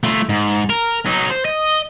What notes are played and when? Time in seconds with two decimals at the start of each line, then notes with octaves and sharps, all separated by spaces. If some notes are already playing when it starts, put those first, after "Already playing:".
0.04 A3 F4
0.29 G#2
0.70 A#4
1.06 F#3 D#4
1.30 C5
1.45 D#5